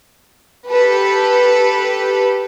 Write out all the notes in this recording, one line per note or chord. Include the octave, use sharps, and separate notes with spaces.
G4 A4 B4